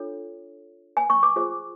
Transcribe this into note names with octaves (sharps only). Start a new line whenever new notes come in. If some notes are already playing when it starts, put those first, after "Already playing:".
Already playing: D4 F4 A4 C#5
G#5
C#6
D6
F4 G#4 C5